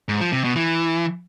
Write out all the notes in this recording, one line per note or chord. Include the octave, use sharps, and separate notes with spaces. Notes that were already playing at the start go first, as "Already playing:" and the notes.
G#2
F3
C3
B2
E3